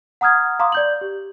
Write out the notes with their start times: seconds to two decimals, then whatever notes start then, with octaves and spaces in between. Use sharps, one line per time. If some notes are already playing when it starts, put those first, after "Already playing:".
0.21 F#5 A#5 D#6 F6 G#6
0.59 F5 A#5 C6 D6 D#6
0.72 D5 G6 F#7
1.01 G4